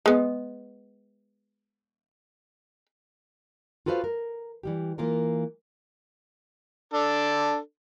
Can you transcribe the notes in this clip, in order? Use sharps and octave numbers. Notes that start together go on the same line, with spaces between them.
G#3 B3
F4 F#4 A4 B4 C5 F5
A#4
E3 G3 G4
E3 A#3 F4 A#4
D4 A4